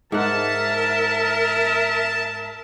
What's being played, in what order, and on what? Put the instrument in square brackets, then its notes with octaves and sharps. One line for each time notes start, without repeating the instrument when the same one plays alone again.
[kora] G#2 F#5 [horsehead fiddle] A#4 E5 [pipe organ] A5